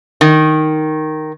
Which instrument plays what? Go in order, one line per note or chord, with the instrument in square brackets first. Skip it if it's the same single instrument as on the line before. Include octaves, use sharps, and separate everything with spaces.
[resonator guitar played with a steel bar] D#3